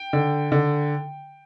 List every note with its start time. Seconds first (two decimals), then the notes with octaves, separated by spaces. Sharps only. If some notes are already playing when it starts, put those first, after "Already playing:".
Already playing: G5
0.13 D3
0.52 D3